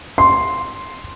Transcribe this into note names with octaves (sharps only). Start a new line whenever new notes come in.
C6